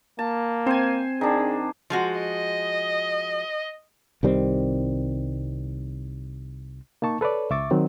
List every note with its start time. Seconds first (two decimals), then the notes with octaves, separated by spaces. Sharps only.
0.19 A#3 A5
0.66 C4 C5 G#5
1.21 D#3 D4 G#4
1.90 F3 G#3 F#4
2.20 D#5
4.23 C2 D#3 G3 C4
7.02 A#3 D#4 A5 C#6
7.21 A4 B4 C#5 D5
7.50 C#2 E5 C#6 D6 A6
7.71 D#3 F#3 C4